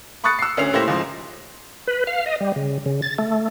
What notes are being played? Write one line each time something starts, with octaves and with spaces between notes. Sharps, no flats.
B5 C#6 D#6 F#6 A6 C#7
E6 C7
D2 C#4 C7 F7
A#2 A3 E4 G4 C5 A#6
C#2 G#2 F3
B4
F5
D#5
G3
C#3
C#3
A6
A3